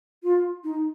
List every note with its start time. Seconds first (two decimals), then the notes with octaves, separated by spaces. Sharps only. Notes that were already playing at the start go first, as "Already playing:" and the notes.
0.23 F4
0.64 D#4